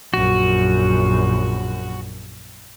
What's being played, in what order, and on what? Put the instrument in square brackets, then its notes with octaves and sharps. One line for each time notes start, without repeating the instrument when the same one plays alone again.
[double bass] A#1 F#2 [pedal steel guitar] F#4